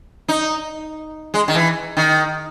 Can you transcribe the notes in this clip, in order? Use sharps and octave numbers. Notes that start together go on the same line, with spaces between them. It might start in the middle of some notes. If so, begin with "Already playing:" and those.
D#4
G#3
D#3
E3
D#3